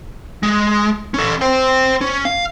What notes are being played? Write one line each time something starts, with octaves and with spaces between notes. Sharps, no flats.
G#3
C#4 A4
C5 G5
C#4
F5